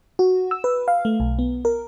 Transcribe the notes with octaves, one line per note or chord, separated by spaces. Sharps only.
F#4
E6
B4
F5
A3
B1
B3
A#4